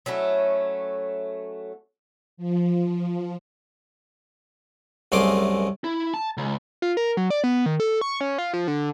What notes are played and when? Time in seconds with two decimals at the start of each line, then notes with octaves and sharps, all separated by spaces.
0.06 F#3 A3 C#4 E4
2.37 F3
5.12 C2 F#2 A3 G#4 C6 D6
5.84 E4
6.14 A5
6.37 C#2
6.82 F4
6.97 A#4
7.17 F#3
7.30 D5
7.44 B3
7.66 D#3
7.80 A4
8.01 C#6
8.21 C#4
8.38 F4
8.53 F3
8.68 D3